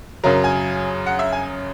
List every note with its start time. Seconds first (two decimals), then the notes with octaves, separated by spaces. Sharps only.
0.24 F#2 C#3 F#3 A#4
0.44 G#5
1.06 F#5
1.19 E5
1.32 G#5